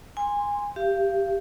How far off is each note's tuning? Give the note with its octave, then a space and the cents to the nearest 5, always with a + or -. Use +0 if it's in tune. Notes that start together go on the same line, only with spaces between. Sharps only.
G#5 -20 C6 +0
G4 +0 F5 -35